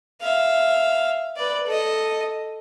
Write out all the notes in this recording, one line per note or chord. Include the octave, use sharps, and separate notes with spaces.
E5 F5
B4 D5
A4 D#5